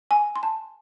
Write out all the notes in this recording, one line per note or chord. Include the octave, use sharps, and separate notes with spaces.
G#5
C6
A5